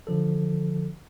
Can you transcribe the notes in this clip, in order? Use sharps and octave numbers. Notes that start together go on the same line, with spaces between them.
D3 F3 A4